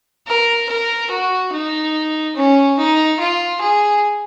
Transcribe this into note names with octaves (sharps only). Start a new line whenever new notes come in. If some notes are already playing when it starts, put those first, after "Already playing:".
A#4
A#4
F#4
D#4
C#4
D#4
F4
G#4